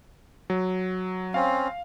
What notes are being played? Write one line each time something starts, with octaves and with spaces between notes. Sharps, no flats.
F#3
C4 C#4 F5